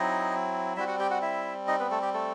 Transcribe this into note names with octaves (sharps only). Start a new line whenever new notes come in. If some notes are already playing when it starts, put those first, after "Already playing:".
Already playing: F#3 C4 D#4 E4 D#5
G3 C4 E4 F#4 E5
F#4 F#5
G4 G5
F#4 F#5
E4 E5
D#4 D#5
B3 B4
A3 A4
G4
A3 A4